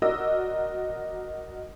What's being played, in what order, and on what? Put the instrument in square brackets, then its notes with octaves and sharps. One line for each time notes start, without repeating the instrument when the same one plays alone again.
[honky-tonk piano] F#4 A#4 D5 D#5 E6